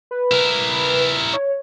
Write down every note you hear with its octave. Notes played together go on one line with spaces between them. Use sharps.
B4
E4 A#4
C#5